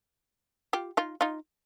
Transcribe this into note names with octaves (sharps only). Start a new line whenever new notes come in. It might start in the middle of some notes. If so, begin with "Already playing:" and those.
F4 G4
D#4 F4
D#4 F4